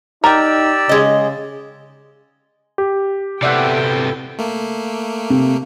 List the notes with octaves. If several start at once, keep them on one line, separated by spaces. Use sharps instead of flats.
D#4 G4 A#4 D5 G5 E6
C#3 G#3 D#5
G4
C3 B3 E4 A4 D5 E5 F#5 G5
A3 A#3
C3